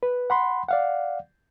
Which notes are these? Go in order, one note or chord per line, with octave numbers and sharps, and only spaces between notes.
B4
F#5 B5 C6
D5 F5 F#5